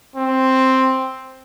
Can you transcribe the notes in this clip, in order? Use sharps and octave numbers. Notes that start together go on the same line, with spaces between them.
C4